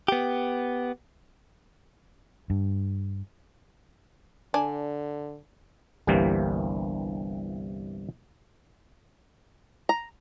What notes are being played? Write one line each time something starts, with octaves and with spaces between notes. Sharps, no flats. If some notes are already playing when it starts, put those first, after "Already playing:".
B3 G4
G2
D3 D4 G#5
G1 C2 G2 C3 E3 A#3
A#5